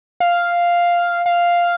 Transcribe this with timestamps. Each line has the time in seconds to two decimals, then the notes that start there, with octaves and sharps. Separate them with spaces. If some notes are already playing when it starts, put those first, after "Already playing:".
0.20 F5
1.26 F5